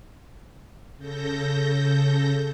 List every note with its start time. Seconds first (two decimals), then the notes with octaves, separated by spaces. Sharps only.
0.97 C#3 A4 G6 A#6